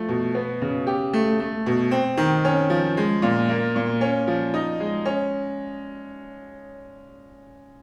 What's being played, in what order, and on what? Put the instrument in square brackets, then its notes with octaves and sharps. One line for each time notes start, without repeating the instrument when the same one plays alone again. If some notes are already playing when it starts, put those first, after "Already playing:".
Already playing: [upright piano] F3 A3
B2
B3
C#3
G4
A3
A3
B2
C4
D#3
C#4
F3
G#3
A#2
A#3
A#2
C#4
F3
D#4
G#3
C#4